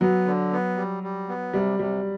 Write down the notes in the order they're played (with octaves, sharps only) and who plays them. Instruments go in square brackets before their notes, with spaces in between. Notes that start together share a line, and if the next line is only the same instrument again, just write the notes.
[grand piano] F#3 [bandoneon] B3
[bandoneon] D3
B3
G3
G3
B3
[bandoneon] C3 [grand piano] G3
[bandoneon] C3 [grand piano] G3